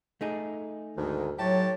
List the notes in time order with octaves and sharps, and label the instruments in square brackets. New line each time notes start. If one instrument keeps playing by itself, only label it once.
[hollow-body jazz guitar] A3 D#4 G#4
[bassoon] D2 [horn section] G#2 D#3
[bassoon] A2 [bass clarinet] F#3 [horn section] G4 C#5 A5